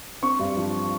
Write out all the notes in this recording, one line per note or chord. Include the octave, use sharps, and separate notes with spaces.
C4 C#6
G2
F3